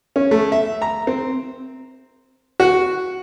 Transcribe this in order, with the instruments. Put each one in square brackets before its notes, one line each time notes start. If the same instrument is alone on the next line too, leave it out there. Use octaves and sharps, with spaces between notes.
[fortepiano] C#4
A3
E5
A#5
C4
F#4